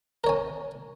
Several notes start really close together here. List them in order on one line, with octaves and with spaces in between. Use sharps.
A#4 C#5 G#5